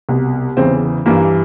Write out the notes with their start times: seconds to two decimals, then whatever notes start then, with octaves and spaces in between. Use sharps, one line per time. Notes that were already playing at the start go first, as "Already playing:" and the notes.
0.09 C2 B2
0.57 E2 C#3 E3 C4
1.06 G2 E3 A#3